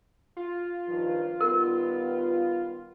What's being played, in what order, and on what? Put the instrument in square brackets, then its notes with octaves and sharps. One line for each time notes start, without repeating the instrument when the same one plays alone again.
[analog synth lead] F4
[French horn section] G2 D#3 F3
[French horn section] D#3 G3 B3 [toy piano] A#4